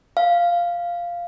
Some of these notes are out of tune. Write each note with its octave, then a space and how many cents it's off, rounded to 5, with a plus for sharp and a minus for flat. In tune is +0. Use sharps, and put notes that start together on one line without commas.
F5 -5